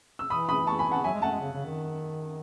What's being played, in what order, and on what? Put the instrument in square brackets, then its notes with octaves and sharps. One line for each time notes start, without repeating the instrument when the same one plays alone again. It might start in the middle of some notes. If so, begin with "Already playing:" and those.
[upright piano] E6
[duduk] E3 [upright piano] B5 D#6
[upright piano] B5 D#6
A5 C#6
G#5 B5
F#5 A5
[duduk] F#3 [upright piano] E5 G#5
[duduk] G#3
[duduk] A3 [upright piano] F#5 A5
[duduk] G#3
C#3
C#3
D#3